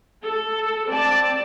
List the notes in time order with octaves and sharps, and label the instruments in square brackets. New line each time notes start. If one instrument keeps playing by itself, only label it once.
[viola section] A4
C4 D5 A5